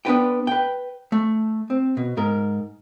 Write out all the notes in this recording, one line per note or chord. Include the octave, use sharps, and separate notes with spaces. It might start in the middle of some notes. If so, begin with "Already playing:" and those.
B3 D4 B4 G5
B4 G5
A3
C4
B2
G#2 A#4